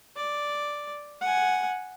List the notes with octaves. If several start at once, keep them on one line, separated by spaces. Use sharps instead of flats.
D5
F#5 G#5